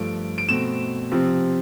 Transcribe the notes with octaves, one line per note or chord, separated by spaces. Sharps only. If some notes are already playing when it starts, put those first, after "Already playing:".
Already playing: G2 F3 A3 D7
D7
B2 A3 C4 E7
C3 F3 C4